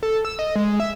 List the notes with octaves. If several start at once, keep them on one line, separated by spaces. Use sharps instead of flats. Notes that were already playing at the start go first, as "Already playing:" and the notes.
A4
E6
D#5
G#3
E5